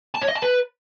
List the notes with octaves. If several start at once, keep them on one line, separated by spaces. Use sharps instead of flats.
A5
C#5
D#5
A5
B4